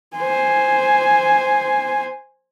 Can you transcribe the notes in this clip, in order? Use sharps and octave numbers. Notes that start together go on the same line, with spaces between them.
C5 G#5